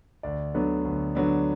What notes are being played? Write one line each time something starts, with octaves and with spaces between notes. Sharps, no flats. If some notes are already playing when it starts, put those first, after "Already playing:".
D2 D5
D3 F#3 B3 D4
D2
D3 F#3 B3 D4